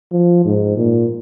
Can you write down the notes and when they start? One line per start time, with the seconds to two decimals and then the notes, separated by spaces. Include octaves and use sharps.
0.12 F3
0.45 G#2
0.77 A#2